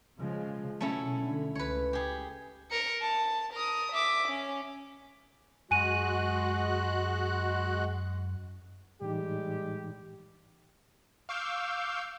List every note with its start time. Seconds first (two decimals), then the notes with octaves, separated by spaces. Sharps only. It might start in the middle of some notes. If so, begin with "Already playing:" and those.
0.18 C#3 F3 G#3
0.81 B2 F#3 A3 C#4 E4
1.21 D3
1.55 C#2 B4 C#5
1.93 G4 G#4
2.71 A#4 C#7
3.02 A5
3.54 A#4 D#6
3.92 E5 D6
4.29 C#4
5.71 F#2 G#3 F#4 G#5 F#6 D#7
9.02 A2 E3 G3 G#3 D#4 G4
11.29 F5 C#6 D6 E6 G6